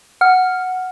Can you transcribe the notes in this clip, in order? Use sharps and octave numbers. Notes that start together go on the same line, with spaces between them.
F#5 F6